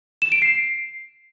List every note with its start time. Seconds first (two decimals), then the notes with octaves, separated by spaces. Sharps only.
0.22 E7
0.32 D7
0.42 C7